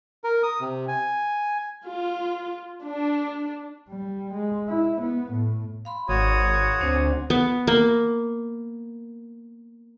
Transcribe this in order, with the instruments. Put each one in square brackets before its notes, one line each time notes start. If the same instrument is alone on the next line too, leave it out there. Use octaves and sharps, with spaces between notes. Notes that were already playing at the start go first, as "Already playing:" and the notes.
[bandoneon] A#4
D#6
C3
G#5
[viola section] F4
D4
[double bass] G3
G#3
E4
B3
A2
[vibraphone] F5 B5 C6
[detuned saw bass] G#1 [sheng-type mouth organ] F#4 C#5 D#6
[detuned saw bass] D2 [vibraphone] C4 D4 C5
[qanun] B3
A#3